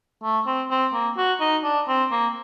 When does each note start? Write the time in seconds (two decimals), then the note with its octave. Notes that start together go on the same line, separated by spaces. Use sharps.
0.23 A3
0.46 C4
0.71 C4
0.94 A#3
1.17 F#4
1.40 D#4
1.64 D4
1.88 C4
2.11 A#3